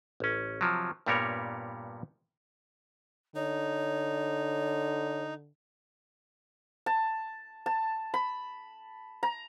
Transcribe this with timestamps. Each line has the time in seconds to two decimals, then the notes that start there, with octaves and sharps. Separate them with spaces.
0.20 A1 C#4
0.61 C3 F3 F#3
1.06 G2 A#2 G3 B3 A#4 C#5
3.35 D3 D#4 C#5
6.86 A5
7.66 A5
8.14 B5
9.23 A#5